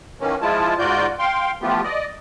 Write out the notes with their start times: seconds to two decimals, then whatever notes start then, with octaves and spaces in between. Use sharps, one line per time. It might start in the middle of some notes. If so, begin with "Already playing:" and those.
0.21 D#3 E3 A#3 C#4
0.42 F3 G#3 E4 F4 A5
0.79 G#2 F4 F#4 D5 G6
1.19 F5 G5 C6
1.62 E3 F3 A3 B3 F4 G4
1.84 D5 D#5